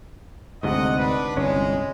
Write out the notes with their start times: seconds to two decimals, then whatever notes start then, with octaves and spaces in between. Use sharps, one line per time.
0.63 D2 G#2 C3 A4 D#5 F#5
0.99 D4 B4
1.36 G1 C2 G#3 C#4